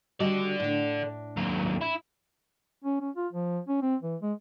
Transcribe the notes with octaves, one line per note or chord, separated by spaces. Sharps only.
G3 F#4 A4 D5 D#5
A2 D4
D#2 F#3
E4
C#4
C#4
F4
F3
C#4
C4
E3
G#3